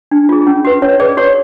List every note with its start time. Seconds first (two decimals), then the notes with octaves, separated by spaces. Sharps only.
0.11 D4
0.29 F4 G#4
0.47 C#4
0.65 F#4 B4
0.82 C#4 C#5
1.00 G#4 B4 D5
1.17 F#4 C#5